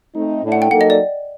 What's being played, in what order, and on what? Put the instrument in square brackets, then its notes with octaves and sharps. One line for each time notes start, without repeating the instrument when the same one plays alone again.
[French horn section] A3 C4 D#4
A2 A3 D4
[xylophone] F#5
G5
[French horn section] F#3 A#3 D#4 A4 [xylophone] F#5
[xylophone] D#5
D5